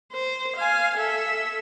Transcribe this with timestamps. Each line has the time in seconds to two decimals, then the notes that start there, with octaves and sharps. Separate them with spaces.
0.13 C5
0.56 F5 G#5
0.97 A4 E5